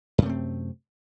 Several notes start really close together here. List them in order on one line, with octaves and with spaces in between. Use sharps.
F#2 C3 A3 C4